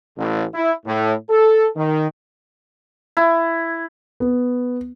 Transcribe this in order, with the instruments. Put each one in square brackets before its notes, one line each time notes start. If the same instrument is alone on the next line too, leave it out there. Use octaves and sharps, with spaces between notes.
[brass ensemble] A1
E4
A2
A4
D#3
[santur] E4
[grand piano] B3